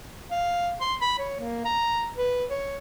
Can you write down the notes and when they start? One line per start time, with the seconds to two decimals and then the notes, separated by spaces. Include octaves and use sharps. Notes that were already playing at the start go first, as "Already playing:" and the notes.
0.31 F5
0.81 C6
1.01 B5
1.19 C#5
1.40 A#3
1.65 A#5
2.17 B4
2.50 C#5